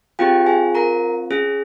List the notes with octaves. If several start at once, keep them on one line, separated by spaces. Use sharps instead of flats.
C4 F4 G4 G#4 G5
G#4 G#5
A#4 A#5
C#4 G#4